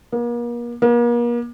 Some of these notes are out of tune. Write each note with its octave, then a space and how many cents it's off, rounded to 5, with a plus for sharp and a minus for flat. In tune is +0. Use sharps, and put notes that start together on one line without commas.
A#3 +40
A#3 +40